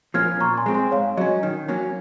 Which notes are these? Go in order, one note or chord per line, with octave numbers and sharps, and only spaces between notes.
F3 A#3 C#4 F6 G#6
A#2 A#5 C#6
G#5 C6
G#3 C4
G#5 C6
G#2 C#5 F5
F#3 C#4 D#5
D#3
F#3 A#3 C#4